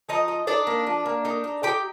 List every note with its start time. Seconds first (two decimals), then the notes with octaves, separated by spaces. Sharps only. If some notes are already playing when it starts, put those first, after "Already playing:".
0.09 F3 D#4 D#5
0.28 D#4
0.47 D4 D#4 D5
0.67 A#3
0.87 F3
1.06 A#3
1.25 D#4
1.44 D#4
1.63 D#4 G4 G5